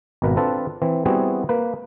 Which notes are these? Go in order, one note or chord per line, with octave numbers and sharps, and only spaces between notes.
G#1 B2 A#4 B4
C4 D4 F4 A4 B4
E3 C4
G3 B3 C4 E4 F#4 G#4
A#3 B4